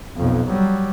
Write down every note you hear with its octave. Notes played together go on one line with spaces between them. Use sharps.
B1 F2
F#3 G3